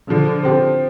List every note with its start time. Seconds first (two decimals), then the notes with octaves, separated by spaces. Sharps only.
0.10 D3 F3
0.43 C4 G4 C5